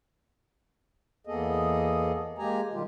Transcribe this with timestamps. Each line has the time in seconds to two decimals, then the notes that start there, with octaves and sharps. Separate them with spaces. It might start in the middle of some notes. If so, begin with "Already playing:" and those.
1.27 E2 A#3 B3 G#4 A4 D#5
2.38 G#3 A#3 G4 G#5 A#5
2.73 B2 D#3 G3 F4 G4